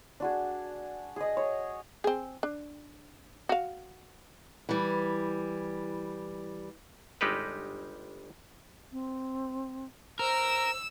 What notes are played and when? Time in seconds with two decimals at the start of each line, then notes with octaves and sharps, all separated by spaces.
0.20 D4 F#4 G#4
1.16 G#4 D#5
1.37 C#5
2.04 C4 G#4
2.43 D4
3.49 F#4 F5
4.69 E3 G3
7.21 G1 G3 G#3 D#4 G4 B4
8.92 C4
10.19 A#4 C5 E6